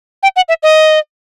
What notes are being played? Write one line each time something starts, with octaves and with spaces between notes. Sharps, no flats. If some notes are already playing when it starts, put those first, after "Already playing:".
G5
F#5
E5
D#5